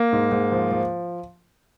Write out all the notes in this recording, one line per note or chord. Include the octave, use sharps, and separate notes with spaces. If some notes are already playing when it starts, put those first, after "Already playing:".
Already playing: A#3
G#2
G#2
F3
F3